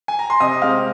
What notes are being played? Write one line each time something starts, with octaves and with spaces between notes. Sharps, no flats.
G#5
A#5
C6
C3 D#5 D#6
G#3 C4 F5 F6